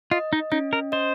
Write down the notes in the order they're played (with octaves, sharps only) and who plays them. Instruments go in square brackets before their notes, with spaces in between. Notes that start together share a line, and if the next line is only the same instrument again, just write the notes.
[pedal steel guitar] F4 [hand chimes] D#5
[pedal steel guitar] D#4
[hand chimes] C#4 [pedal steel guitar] D#4
[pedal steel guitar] A#4
[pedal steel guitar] C5 [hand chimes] D#5